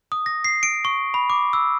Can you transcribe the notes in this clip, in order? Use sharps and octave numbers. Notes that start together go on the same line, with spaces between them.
D#6
A#6
C7
D7
C#6
B5
D6
E6